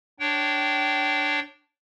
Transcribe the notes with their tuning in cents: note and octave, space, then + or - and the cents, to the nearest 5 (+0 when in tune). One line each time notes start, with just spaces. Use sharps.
D4 +0 C#5 +0 G5 -25